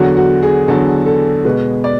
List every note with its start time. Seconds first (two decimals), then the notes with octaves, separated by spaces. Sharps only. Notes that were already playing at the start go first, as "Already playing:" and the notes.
Already playing: E2 D3 F#3 F#4
0.17 F#4
0.43 G#4
0.68 E2 D3 F#3 A4
1.06 A4
1.45 B2 G#3 B4
1.84 D5